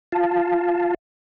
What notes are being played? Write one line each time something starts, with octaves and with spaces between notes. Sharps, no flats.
F4 F5 A5